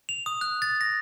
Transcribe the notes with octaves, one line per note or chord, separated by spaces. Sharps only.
F7
D#6
F#6
A6
A#6